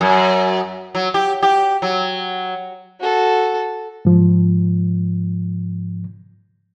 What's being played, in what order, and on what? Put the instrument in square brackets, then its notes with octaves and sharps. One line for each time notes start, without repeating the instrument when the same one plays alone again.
[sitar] F#2
F#3
G4
G4
F#3
[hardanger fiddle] F#4 A4
[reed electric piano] G#2 F3